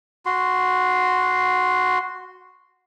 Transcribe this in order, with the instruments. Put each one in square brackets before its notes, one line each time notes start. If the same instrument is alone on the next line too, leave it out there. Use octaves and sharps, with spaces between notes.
[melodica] F#4 C6